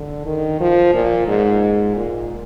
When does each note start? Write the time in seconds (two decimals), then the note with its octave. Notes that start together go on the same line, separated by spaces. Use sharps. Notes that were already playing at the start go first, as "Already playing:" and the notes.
Already playing: D3
0.26 D#3
0.60 F3
0.94 A#2
1.28 G#2
1.96 A#2